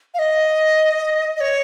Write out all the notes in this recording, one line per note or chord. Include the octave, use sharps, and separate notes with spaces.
F5
D#5
D#5
C#5